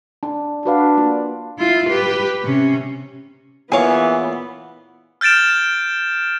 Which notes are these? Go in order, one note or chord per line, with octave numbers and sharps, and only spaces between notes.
D4
D4 F#4 B4 F5
A#3 F4
E4 F4
G4 B4
C3 C#4
A#2 E3 B3 G#4 C#5 F5
F6 G6 A6 D7 E7